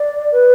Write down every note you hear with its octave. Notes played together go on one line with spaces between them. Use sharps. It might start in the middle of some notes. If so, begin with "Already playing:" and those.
Already playing: D5
B4